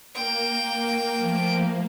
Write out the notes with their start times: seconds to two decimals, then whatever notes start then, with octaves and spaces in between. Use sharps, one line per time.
0.15 A#3 G5
1.19 F3 A3